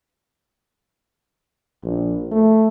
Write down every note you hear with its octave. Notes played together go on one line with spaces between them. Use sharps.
A#1
A3